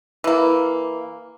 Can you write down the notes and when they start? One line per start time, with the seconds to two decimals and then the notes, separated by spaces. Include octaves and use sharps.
0.24 E3 A#3